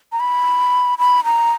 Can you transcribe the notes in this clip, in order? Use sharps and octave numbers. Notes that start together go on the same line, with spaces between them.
A#5
B5
B5
A#5